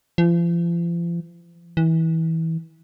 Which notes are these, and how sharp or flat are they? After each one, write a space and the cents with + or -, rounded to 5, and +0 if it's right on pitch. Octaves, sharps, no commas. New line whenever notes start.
F3 -40
E3 -25